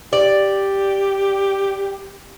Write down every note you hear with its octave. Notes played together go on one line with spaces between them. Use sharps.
G4 D5